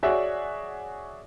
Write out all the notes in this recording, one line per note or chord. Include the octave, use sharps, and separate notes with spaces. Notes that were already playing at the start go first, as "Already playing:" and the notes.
F#4 G#4 C#5 D5 E5 F#5